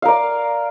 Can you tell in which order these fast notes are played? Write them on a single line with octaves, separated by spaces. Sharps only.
F5 A#4 D5